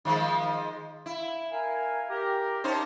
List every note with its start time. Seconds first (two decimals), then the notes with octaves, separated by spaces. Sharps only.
0.05 D#3 F3 G#3
1.06 E4
1.52 A#4 F5 G#5
2.10 G4 A#4
2.64 C#4 D#4 G4 C5 A5